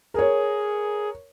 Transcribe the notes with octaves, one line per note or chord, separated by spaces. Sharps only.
G#4 A#4 C#5